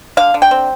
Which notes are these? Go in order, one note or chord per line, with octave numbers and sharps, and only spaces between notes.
D3 F5
D3
G5
C4